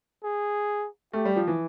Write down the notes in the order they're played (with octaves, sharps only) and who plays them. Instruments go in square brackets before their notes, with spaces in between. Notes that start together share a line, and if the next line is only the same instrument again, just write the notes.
[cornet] G#4
[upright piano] A3 [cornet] G4
[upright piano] G3
F3
E3